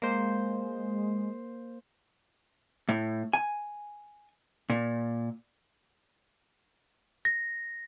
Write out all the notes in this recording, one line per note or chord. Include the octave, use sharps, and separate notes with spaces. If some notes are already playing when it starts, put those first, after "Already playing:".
G#3 A#3 C5
A2
G#5
A#2
A#6